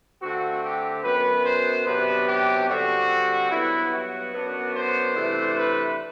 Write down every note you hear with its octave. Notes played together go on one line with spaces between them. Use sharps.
D3 A3 C4 F#4
G4
F#2 F#3 B3 B4
C5
C3 F#3 B3 D4 B4
G4
D3 G3 C4 F#4
G2 F#3 B3 E4
F#4
F#2 F#3 B3 D4
C5
C3 E3 A3 D4
B4